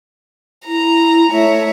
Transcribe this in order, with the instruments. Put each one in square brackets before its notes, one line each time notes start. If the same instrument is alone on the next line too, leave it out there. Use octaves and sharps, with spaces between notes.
[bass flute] E4 [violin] A#5
[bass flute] A3 [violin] C#5 E5